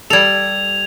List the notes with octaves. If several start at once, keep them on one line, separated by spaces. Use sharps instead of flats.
G3 A4 G#6 F7